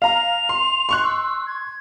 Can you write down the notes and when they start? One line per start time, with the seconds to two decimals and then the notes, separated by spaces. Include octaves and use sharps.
0.02 F5 A#5 F7
0.49 C6
0.89 C6 C#6 F#6
1.04 E6
1.47 G#6